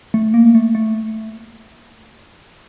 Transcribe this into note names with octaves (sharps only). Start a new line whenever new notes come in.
A3
A#3
A3
A3